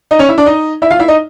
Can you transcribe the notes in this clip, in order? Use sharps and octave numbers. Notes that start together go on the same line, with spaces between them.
D#4 D#5
C#4 C#5
E4 E5
D4 D5
D#4 D#5
E4 E5
F4 F5
E4 E5
D#4 D#5